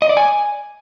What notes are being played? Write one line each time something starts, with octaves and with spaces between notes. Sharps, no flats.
D#5
D5
G#5